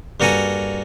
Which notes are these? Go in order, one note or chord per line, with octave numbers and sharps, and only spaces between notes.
G2 A#3 F#4 A4 G#5 A#5